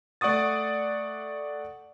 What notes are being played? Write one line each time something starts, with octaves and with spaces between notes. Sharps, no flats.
A3 D5 F#5 C#6 D#6 A6